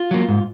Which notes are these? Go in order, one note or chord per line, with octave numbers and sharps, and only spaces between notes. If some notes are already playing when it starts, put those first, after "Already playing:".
Already playing: F4
F#3 A#3
G#2